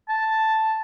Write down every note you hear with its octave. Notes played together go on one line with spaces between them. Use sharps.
A5